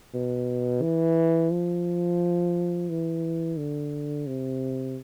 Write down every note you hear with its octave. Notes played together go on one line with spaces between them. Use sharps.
B2
E3
F3
E3
D3
C3